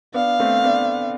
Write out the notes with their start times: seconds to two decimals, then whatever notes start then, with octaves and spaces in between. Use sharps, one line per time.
0.14 B3 D4 F5
0.40 A3 C4
0.64 B3 D4